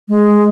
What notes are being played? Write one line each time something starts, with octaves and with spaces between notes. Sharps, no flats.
G#3